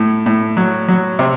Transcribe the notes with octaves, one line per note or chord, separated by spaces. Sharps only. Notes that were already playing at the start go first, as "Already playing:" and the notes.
Already playing: A2
A2
F#3
F#3
C3